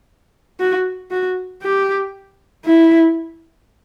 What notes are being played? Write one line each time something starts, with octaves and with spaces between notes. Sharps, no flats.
F#4
F#4
G4
E4